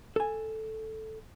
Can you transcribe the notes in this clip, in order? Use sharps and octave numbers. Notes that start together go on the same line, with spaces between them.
A4 G#5